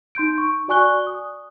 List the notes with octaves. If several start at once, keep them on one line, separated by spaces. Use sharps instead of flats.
D#4 C6 G6 D7
C#6
F#4 D5 G#5 C#6 F#6 G7
D#6